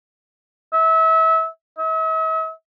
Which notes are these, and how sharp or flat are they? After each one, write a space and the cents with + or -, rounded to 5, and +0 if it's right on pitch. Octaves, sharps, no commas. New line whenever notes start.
E5 -30
E5 -45